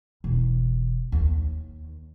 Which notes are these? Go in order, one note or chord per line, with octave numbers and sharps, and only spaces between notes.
E1
D#2